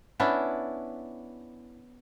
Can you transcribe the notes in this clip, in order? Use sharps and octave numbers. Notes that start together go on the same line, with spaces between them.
B3 C#4 D4 E4